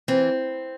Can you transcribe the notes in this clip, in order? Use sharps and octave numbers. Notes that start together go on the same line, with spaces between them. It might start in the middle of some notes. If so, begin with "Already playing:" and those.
E3 C4